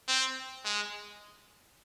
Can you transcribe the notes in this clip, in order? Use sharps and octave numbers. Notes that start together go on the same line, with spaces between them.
C4
G#3